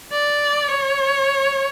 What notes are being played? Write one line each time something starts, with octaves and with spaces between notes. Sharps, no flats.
D5
C#5